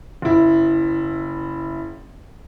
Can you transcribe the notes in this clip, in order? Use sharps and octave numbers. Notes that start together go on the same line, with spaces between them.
F#1 E4